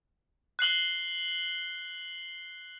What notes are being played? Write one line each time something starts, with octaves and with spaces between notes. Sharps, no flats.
F#6 C7 F#7 G7